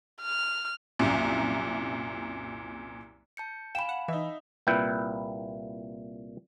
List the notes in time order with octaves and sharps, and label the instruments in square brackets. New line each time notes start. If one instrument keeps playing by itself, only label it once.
[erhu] F6
[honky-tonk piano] C2 F#2 A#2
[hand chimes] A5 G6 C#7
[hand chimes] F5 G#5 B5 [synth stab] G5 [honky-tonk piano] E7
[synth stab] F#5
[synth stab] E3 [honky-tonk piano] D#4 E5
[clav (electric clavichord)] C2 A#2 E4 B4 G5